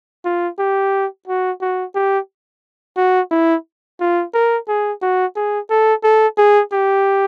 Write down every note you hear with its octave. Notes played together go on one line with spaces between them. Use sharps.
F4
G4
F#4
F#4
G4
F#4
E4
F4
A#4
G#4
F#4
G#4
A4
A4
G#4
G4